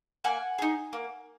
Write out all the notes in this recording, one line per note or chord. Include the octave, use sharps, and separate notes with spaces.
A#3 F#5 G#5
D#4 G#4
A#3